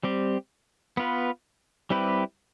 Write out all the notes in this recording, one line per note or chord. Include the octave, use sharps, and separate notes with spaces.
G3 C4 G4
B3 F4 B4
G3 C4 E4 G4 B4